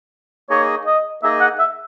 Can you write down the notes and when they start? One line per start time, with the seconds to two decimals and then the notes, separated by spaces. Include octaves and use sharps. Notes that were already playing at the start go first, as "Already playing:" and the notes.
0.49 A#3 D#4 G#4 C#5 D#5
0.86 D#5
1.22 A#3 D#4 G#4 D#5 E5
1.41 F#5
1.59 E5